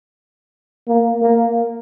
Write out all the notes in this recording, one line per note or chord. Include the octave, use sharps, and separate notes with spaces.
A#3
A#3